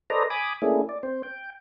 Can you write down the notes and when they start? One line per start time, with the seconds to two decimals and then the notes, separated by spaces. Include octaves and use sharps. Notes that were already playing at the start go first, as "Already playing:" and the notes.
0.10 A4 B4 C5 D5 D#5 A#5
0.30 G#5 B5 D6 D#6
0.62 A3 A#3 C#4 D4 E4 G#4
0.89 D5
1.03 C4 C5
1.23 G5